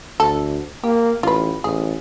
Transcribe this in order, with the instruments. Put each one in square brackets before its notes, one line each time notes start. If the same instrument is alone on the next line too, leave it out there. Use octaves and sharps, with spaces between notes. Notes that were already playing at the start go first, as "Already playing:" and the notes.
[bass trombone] D2 [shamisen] A4
[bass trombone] A#3 [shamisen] G4
[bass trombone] A1 [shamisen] F4 B4
[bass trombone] A1 [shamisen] G#4